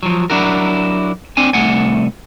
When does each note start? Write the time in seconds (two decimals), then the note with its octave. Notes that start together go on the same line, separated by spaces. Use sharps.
0.03 F3 F#3
0.30 F#3 D4 E4 F#4 A#4
1.37 C4 D4 G#5
1.53 C2 F#2 A3 F#5 G#5